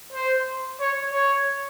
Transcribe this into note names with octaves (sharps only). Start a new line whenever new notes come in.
C5
C#5
C#5